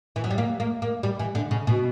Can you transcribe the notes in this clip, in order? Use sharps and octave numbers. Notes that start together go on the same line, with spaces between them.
E3
F#3
G3
A#3
A#3
A#3
G3
E3
D3
C#3
B2